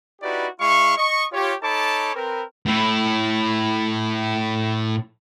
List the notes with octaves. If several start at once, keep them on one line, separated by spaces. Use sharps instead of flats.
D#4 E4 F#4 G4 B4 D5
G#3 E4 F5 C#6
D#5 C#6
F4 G4 C#5
D#4 A4 C#5 A5 B5 D6
C4 A#4 B4
A2 E4